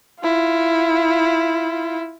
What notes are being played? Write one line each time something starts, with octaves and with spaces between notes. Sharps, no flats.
E4 F4